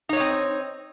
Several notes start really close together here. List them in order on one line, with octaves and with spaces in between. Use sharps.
D#4 C#5 D#5 C4